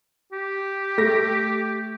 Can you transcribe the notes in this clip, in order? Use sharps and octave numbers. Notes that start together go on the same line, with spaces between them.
G4
A3 A#6